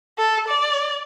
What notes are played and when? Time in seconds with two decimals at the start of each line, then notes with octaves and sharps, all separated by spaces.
0.18 A4
0.48 D5